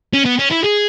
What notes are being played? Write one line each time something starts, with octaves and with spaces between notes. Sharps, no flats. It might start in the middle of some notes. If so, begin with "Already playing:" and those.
C#4
B3
C#4
E4
G#4